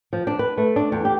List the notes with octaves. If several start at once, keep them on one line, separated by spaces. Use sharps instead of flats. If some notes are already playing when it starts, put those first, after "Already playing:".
F3
D4
B4
A3
D4
E2
G4